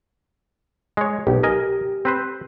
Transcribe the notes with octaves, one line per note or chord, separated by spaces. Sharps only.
G#3 C#5
B1 G4
A#4 D#5 G#5
C4 B4 C5